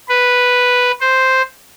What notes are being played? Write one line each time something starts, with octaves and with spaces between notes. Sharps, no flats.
B4
C5